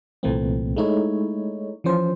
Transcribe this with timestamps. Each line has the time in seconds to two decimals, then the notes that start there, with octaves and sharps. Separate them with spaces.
0.23 C2 A#2 E3 A3 A#3 C4
0.76 G#3 A3 D#4 E4 C#5
1.84 E3 F3 C#4 C5